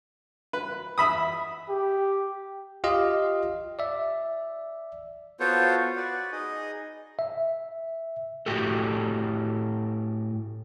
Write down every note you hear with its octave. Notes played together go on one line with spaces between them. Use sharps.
B4
E5 B5 D#6
G4
F4 G4 D#5 F5
D5 E5
B3 F4 F#4 A4 C5 C#5
F#4 B4 D5
D#4 G#4 D#5
E5
A2 F#4 G4 A4